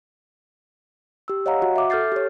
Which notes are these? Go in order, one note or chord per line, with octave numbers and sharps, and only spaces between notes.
G4 E6
C#5 D#5 F5 F#5 A#5
F#4 F#5
E5 D6
A4 F6 G6 A6 C7
G4 C#5